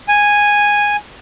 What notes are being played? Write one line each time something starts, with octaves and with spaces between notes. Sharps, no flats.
G#5